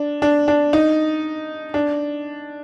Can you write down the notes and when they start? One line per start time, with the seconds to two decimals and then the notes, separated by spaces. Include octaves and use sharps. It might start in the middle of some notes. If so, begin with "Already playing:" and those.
Already playing: D4
0.22 D4
0.48 D4
0.73 D#4
1.74 D4